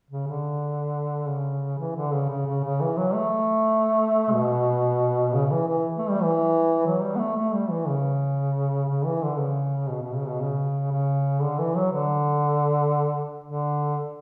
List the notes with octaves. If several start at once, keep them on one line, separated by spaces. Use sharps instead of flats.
C#3
D3
C#3
E3
D3
C#3
C#3
C#3
C#3
E3
F#3
A3
B2
C#3
E3
E3
A3
G3
E3
F#3
G3
B3
A3
A3
G3
E3
C#3
C#3
E3
D3
C#3
B2
B2
C#3
B2
C#3
C#3
D3
E3
F#3
D3
D3